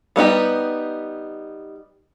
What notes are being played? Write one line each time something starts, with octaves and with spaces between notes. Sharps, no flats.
G3 B3 D#4 G4